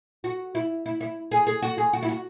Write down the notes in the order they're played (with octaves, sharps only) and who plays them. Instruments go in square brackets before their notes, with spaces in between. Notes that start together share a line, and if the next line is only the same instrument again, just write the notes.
[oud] F#4
E4
E4
E4
G#4
G#4
F#4
G#4
F#4
E4
F#4